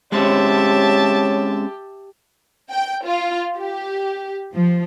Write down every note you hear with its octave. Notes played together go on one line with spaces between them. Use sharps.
G#3 C4 C#4 G4 C#5 E5 A5
G5
F4
G4
F3